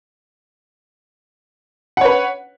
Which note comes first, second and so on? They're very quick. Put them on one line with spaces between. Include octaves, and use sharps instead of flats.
F#5 C#5 B4